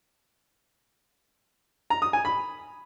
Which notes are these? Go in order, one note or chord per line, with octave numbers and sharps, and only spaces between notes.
A#5
D#6
G#5
B5